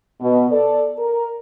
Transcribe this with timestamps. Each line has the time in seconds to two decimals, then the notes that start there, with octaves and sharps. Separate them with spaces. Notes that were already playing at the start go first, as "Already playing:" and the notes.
0.21 B2
0.51 A4 D5
0.97 A#4